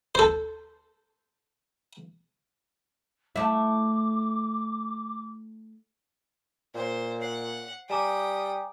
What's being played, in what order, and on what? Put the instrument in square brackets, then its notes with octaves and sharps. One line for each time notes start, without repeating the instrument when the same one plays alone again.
[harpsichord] A4 C5
[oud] A3 E4 [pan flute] D6
[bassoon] A#2 [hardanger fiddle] C5
[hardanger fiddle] F#5 [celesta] C7
[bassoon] G3 [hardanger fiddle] G5 D#6 [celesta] G#5 A#5 D6